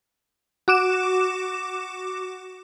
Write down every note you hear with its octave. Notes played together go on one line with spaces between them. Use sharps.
F#4 D6 E7